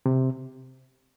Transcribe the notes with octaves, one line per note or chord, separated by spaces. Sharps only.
C3